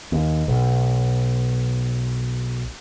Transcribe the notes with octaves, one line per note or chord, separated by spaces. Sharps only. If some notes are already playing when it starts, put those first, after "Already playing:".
D#2
B1